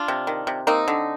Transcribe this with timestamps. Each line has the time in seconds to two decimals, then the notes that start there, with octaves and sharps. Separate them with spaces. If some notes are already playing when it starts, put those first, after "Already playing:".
Already playing: D4 F4
0.08 C3
0.27 D#3
0.47 C3
0.67 A#3 C4 D#4
0.88 D3